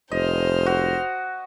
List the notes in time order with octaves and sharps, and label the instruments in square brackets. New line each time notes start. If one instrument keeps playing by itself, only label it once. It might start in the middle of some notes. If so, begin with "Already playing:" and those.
[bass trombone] F1 [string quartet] C5 F6 [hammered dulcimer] D#5
[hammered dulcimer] F#4